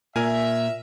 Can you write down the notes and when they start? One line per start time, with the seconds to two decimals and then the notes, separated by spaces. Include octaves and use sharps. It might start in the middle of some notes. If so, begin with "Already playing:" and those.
0.16 A#2 A#4 E5 G#5